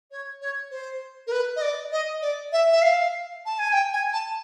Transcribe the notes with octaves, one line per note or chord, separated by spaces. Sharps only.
C#5
C#5
C5
A#4
B4
D#5
D5
D#5
D5
E5
E5
F5
A5
G#5
G5
G#5
A5